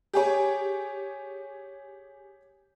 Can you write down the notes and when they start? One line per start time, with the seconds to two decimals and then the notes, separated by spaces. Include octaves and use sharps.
0.13 G4 G#4 C#5